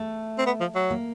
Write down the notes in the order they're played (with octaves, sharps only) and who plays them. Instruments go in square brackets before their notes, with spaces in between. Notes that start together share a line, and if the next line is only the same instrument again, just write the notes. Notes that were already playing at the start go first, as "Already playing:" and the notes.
Already playing: [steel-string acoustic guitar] A3
[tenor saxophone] C4
B3
F3
F#3
[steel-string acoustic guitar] A#3